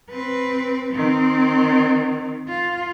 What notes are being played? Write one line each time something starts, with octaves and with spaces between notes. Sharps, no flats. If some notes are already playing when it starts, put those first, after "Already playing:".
C4 B4
D#3 C4
F4